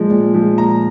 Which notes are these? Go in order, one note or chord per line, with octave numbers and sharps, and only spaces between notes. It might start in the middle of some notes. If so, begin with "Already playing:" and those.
Already playing: A#2 F3 G#3
A#2
F3 G#3
A#2 A#5